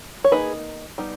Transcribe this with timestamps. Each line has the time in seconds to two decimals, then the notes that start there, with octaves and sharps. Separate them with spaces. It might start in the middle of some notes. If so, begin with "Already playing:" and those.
0.24 C#5
0.32 D#3 A#3 D#4 G#4 B4
0.98 G3 B3 D#4